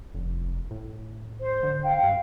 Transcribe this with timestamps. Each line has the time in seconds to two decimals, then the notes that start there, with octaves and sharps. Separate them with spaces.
0.14 F1
0.71 A2
1.40 C5
1.63 D3
1.84 F5 G5
2.03 G2